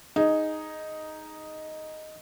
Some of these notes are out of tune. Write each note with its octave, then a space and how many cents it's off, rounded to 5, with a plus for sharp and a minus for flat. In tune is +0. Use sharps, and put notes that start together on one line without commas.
D#4 +0 G#4 +0